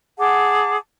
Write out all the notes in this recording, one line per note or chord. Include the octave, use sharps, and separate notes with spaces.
G#4 F#5 A5 D6